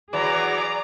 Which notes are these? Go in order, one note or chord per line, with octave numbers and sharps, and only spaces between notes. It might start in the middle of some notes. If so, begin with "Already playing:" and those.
E3 F#3 G#4 D5 A#5